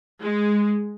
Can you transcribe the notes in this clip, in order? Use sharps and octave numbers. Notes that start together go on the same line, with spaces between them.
G#3